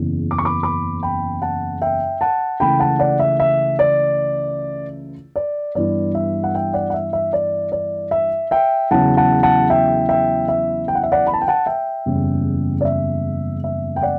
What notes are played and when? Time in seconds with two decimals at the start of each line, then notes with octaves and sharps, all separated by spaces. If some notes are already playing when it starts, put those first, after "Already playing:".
Already playing: F#1 E2 C#3 E3
0.31 D6
0.38 C#6
0.45 B5 D6
0.63 B5 D6
1.03 G5 B5
1.42 F#5 A5
1.82 E5 G5
2.21 F#5 A5
2.60 C#2 C#3 E3 A3 G5 B5
2.80 F#5 A5
2.99 D5 F#5
3.20 E5
3.40 E5
3.79 D5
5.36 D5
5.75 G2 E3 G3 B3 E4 D5
6.15 E5
6.44 F#5
6.55 E5 G5
6.74 D5 F#5
6.90 F#5
6.94 E5
7.13 E5
7.33 D5
7.72 D5
8.11 E5
8.51 E5 G5
8.90 E2 C#3 F#3 C#4 E4 F#5 A5
9.17 F#5 A5
9.43 F#5 A5
9.70 E5 G5
10.09 E5 G5
10.48 E5
10.88 G5
10.95 F#5
11.03 E5
11.12 D5 F#5
11.27 B5
11.33 A5
11.42 G5
11.48 F#5 A5
11.66 E5 G5
12.05 F#1 E2 C#3 G3 C#4
12.81 D5
12.85 E5
13.64 E5
13.96 G5
14.02 D5 F#5